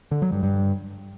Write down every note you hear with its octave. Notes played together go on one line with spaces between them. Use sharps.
D3
F#3
G2
G2